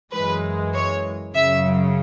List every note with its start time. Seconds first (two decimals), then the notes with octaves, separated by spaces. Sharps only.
0.13 F#2 E3 G#3 B4
0.74 C#5
1.35 F#2 C#3 F#3 E5